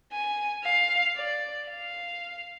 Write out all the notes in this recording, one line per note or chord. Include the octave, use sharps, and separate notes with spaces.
G#5
F5
D5
F5